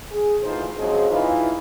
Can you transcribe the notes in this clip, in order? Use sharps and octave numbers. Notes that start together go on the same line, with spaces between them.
G#4
D2 E3 D#4 F4 C5
C#3 F3 F#3 G#3 C4 G#4
E3 D#4 F4